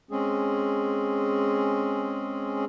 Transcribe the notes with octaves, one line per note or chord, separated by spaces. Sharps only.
G#3 C4 C#4 G#4